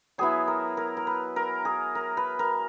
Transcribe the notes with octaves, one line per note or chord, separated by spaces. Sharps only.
F#3 B3 E4 G#4
A#4
A#4
A#4
B4
A#4
G#4
A#4
B4
A#4